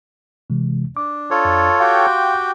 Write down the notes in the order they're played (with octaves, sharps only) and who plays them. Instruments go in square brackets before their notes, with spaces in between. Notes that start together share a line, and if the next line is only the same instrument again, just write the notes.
[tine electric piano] C3 E3 G#3
[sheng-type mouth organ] D4 [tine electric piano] D6
[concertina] F4 A4 C#5
[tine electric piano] F2
[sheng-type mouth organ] F#4 G4 G5 [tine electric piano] F5 C6